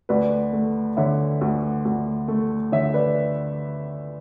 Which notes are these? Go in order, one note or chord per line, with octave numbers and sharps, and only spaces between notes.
D2 B4 D5
A3
D3 C#5 E5
D2
D2
A3
D3 C#5 E5
B4 D5